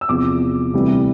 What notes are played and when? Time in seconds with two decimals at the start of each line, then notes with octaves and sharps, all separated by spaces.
0.01 E6
0.09 E2 C3 F3 D6
0.74 D2 C3 E3 G3